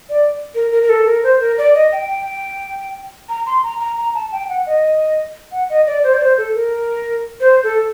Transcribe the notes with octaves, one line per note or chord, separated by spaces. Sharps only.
D5
A#4
A#4
A#4
A4
A#4
C5
A#4
D5
D#5
G5
A#5
C6
A#5
A#5
A#5
A5
G5
F#5
D#5
F#5
D#5
D5
C5
D5
C5
A4
A#4
C5
A4